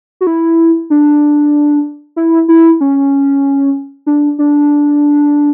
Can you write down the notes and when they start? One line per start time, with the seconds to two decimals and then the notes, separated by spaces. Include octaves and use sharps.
0.21 F#4
0.27 E4
0.90 D4
2.16 E4
2.48 E4
2.81 C#4
4.07 D4
4.39 D4